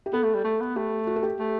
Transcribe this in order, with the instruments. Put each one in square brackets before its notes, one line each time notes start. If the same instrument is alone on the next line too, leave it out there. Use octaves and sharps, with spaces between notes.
[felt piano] G4
[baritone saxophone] B3 [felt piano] A4
[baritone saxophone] A3
G3
A3
B3
[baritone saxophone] A3 [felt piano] G4
[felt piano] F#4
A4
G4
[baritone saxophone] A3